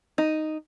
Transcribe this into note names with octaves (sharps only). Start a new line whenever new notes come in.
D#4